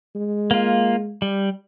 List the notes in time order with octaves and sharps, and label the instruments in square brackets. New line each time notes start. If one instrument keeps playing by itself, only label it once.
[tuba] G#3
[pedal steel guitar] A#3 F4
G3